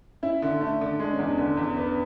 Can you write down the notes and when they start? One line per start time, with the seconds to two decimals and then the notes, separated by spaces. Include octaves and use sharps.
0.23 C#4 E4
0.42 D3
0.61 A3 D4
0.81 D3
1.00 G#3 D4
1.13 C#4
1.19 E2
1.25 D4
1.38 D3
1.57 E2
1.77 B3